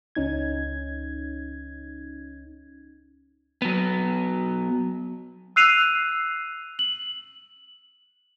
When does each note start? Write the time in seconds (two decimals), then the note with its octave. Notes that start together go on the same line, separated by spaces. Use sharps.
0.15 C#2 C#4 D#4 G#6
3.62 F#3 B3
5.56 E6 F#6 C7 D#7 F7
6.79 F#7